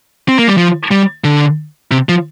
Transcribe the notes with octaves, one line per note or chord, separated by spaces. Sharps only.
C4
A#3
G3
F3
G3
D3
C3
F3